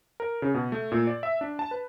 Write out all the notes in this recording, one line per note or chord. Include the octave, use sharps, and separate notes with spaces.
A#4
C#3
B2
A3
A#2
D5
E5
D4
A5
B4